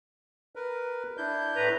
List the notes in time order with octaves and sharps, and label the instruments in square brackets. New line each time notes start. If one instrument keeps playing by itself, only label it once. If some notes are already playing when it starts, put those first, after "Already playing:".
[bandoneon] A#4 B4
D4 E4 G6
[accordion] A2 B4 A#5